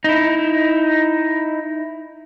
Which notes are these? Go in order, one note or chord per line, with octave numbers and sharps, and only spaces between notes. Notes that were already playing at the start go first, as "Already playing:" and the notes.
D#4 E4